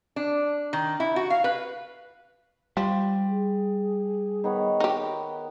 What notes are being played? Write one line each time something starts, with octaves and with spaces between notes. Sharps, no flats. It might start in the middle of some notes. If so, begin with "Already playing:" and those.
D4
D#3
E4
F#4
F5
B4
F3 G3
G#4
D#3 B3 C#5
D#4 G4